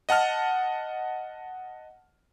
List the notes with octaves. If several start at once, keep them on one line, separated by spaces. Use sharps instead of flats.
D#5 F#5 A5 F6